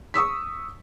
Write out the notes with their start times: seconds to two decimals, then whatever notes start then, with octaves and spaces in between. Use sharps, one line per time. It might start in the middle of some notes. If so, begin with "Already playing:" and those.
0.14 C#6 D#6 E6 B6